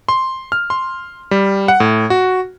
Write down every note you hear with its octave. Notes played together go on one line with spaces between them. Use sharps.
C6
F6
C6
G3
F#5
A2
F#4